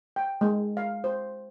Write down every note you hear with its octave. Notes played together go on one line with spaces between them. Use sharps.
G5
G#3
F5
C5